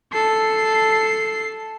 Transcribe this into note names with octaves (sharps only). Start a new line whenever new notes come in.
A4 C7